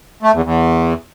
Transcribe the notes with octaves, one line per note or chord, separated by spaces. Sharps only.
A3
E2
E2